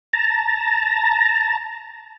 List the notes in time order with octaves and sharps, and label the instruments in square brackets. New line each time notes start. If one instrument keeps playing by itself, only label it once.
[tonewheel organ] A5 A#5